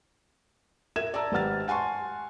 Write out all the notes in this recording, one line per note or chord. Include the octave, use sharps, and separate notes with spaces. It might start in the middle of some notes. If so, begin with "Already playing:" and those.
A#4 E5 G#6 E7
D5 A5 A#5 E6
G#1 G4 B4 F#5 F6 A6
F#5 G#5 A5 C6 C#6